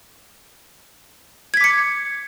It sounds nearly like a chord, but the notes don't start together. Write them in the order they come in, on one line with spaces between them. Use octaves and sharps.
G#6 B6 D6 C#7